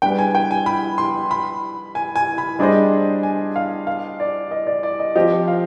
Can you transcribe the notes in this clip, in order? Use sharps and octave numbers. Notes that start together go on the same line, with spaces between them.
G3 D4 G#4 B4 G5
G#5
G5
G#5
B5
C6
B5
G#5
G#5
B5
G3 D4 G#4 C5 D#5
G#5
F5
F5
D5
D#5
D5
D5
D#5
F3 C4 G4 D#5
F5